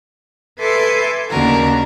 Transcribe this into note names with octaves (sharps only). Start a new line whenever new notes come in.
A4 B4 E5 G#5 C6 D6
D#2 C#3 D4 F#4 A#4